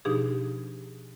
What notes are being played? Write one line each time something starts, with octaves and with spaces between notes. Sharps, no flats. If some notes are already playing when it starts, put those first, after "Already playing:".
B2 F3 D4 D#4 G4 G#4